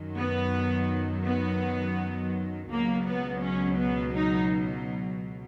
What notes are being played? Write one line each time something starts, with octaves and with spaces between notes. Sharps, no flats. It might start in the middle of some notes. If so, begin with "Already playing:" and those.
Already playing: F#2 D#3 F#3
B3
B3
C#2 B2 F#3 A#3
B3
C#4
B3
D#4